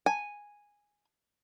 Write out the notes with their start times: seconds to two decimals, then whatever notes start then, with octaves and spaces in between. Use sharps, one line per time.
0.06 G#5